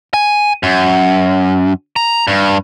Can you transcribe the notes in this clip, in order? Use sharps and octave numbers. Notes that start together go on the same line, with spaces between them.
G#5
F#2
A#5
G2